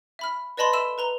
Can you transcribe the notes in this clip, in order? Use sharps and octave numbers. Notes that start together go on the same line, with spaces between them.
E5 B5 F6
B4 D5 D#5 A5 B5 C6
A4 E5 B5 E6 E7 G7
B4 A#5 G7